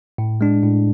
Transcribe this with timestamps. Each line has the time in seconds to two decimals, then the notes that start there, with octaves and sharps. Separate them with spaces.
0.18 A2
0.41 G#3 D4
0.63 A2